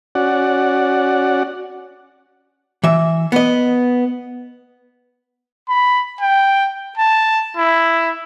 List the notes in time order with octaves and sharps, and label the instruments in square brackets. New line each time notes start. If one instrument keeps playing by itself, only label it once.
[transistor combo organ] C#4 F#4 D5 F#5
[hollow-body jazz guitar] E3 E5
B3 D#5
[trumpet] B5
G5
A5
E4